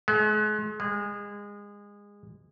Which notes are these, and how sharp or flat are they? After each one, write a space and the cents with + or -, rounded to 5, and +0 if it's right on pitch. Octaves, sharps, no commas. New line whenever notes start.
G#3 +40
G#3 -25